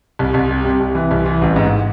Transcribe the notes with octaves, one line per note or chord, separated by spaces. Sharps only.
C2
C2
C3
C3
C2
E3
C2
E3
A1
G#2